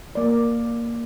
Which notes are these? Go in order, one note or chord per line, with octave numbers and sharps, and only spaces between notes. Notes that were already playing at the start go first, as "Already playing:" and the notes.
A#3 D5